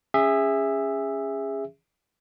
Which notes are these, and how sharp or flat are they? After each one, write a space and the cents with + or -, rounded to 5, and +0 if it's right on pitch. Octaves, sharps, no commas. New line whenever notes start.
C#4 +0 G#4 -25 E5 +0